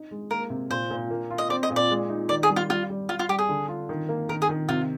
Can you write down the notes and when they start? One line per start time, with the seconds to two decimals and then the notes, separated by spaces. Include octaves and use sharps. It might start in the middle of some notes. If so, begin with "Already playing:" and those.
Already playing: D#4
0.11 G#3
0.31 A#3 A#4
0.50 C3
0.70 A#2 C5
0.90 A#2
1.10 A#3
1.30 F4
1.38 D#5
1.49 C4 D5
1.63 D#5
1.70 A#2
1.76 D5
1.90 G#3
2.10 D#4
2.29 D#3 D5
2.43 G#4
2.50 G3
2.56 F4
2.69 G3 F4
2.90 G3
3.09 G3 F4
3.19 F4
3.29 G3 G4
3.39 G#4
3.49 D3
3.68 F4
3.89 D#3
4.09 A#3
4.29 D#3 A#4
4.42 G#4
4.49 D#3
4.69 C3 F4